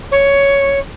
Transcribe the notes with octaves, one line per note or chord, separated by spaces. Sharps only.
C#5